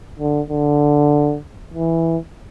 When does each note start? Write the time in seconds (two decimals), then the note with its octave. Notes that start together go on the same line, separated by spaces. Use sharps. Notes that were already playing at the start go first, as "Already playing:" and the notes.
0.19 D3
0.50 D3
1.74 E3